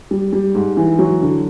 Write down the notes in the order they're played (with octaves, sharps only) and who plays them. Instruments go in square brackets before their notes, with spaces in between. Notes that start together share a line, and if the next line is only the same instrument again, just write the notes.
[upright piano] G3
G3
G#2
E3
F#3
D3